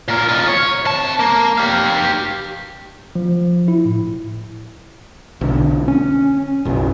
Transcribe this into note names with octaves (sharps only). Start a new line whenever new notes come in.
A#2 A#4
F4 D#5
C#5
C3 A5
A#3
G4 F5
F3
E4
A2
B1 D3
C#4
F#1 B1